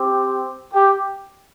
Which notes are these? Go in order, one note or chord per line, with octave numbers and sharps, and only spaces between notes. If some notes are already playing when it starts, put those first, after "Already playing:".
Already playing: C4 G4
G4